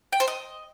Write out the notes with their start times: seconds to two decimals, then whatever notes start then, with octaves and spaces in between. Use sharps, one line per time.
0.13 G5
0.20 C5
0.28 D#5